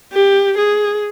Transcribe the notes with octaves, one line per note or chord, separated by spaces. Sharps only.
G4
G#4